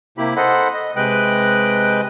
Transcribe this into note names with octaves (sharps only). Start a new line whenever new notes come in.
C3 A#3 E4 G4 B5
A4 C5 D#5 F#5 B5
D#5
C3 G#3 B4 D#5 G5 F#6